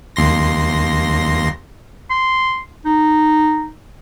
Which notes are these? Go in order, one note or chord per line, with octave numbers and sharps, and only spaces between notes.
D#2 C6 A#6
C6
D#4